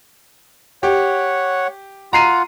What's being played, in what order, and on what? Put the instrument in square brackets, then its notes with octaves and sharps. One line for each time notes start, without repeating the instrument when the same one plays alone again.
[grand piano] G4 [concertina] C#5 F#5
[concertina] F4 F#5 [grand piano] A#5 C7 D#7